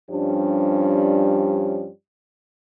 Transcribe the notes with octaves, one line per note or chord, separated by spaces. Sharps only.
G2 F3 G3 C#4 D4